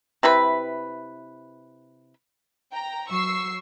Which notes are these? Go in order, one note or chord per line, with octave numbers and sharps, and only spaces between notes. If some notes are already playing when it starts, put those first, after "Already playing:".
C3 E4 B4 B5
G5 A#5
F#3 C#6 E6 C7